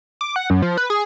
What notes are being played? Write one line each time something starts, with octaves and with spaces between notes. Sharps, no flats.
D6
F#5
F#2
F3
B4
G#4